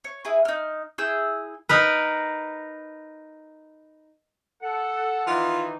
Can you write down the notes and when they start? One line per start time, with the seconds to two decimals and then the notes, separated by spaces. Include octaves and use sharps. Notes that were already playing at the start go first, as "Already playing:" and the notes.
0.04 C#5
0.25 E4 G#4 B4
0.45 D#4 F6
0.98 E4 G#4 E6 G6
1.69 D#4 A#4 B4
4.63 A4 F#5
5.27 D#3 E3 D#4 F4